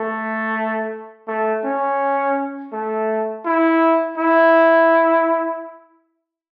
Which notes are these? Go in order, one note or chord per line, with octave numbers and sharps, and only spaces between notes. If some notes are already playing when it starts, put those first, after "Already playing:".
Already playing: A3
A3
C#4
A3
E4
E4